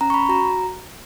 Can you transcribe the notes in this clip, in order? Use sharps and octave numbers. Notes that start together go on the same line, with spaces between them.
C#4 A#5
C#6
B5
F#4 A#5